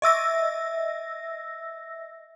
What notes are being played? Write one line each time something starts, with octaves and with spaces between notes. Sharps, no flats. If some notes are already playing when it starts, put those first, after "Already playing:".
D#5 E5 E6 A#6